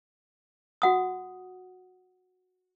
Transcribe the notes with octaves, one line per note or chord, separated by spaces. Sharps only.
F#4 F#5 D#6